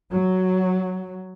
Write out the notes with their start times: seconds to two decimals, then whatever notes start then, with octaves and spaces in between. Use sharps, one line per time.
0.11 F#3